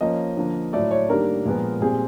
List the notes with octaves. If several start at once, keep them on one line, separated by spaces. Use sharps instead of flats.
F3 A#3 C#4 D#5
D3 F3 A#3
A2 F#3 A3 D5
C#5
D#3 G3 A#3 D4 A#4
A#2 F3 G#3 B3
A#2 G3 C4 G#4